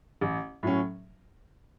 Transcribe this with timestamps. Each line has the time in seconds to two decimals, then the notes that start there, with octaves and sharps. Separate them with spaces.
0.21 A1
0.63 A2 F#3 C#4